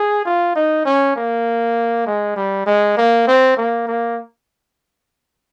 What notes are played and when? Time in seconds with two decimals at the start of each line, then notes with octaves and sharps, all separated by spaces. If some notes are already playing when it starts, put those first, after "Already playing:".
Already playing: G#4
0.25 F4
0.55 D#4
0.85 C#4
1.16 A#3
2.06 G#3
2.36 G3
2.66 G#3
2.97 A#3
3.27 C4
3.57 A#3
3.87 A#3